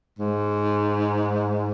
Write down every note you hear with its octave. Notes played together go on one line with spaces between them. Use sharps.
G#2